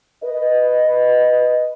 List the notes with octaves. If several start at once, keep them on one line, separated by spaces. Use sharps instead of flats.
B4 D#5